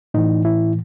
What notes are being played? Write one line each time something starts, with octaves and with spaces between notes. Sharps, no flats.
A2 E3 D#4
E4